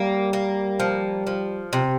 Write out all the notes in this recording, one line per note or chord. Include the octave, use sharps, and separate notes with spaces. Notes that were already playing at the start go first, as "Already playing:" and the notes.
Already playing: G3 A#3
A#3
F3
F3
C3